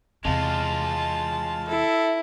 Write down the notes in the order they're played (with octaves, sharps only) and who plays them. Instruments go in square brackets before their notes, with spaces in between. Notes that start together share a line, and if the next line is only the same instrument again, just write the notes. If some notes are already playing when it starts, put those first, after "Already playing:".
[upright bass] E2 C3 [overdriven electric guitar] G#3 F4 [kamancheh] A5
[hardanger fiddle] E4 [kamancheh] A4